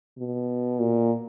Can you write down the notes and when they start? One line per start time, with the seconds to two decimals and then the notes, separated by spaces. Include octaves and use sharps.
0.18 B2
0.79 A#2